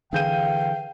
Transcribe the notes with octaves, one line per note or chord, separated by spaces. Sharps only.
D3 E3 G#4 F5 G5 G6 D#7